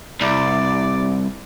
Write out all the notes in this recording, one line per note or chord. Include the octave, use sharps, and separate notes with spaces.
C2 D5